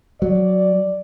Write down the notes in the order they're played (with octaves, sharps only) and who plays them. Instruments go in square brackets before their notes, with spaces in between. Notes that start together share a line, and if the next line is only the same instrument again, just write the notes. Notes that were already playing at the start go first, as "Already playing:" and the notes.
[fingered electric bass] F#3 [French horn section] D5